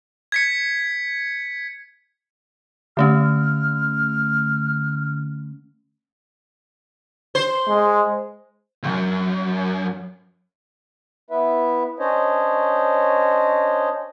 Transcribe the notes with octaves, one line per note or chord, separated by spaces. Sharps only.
G#6 B6 C#7
D3 A3 C#4 F6
C5
G#3
C2 F#2
B3 E4 B4 E5
C#4 D4 C5 C#5 D#5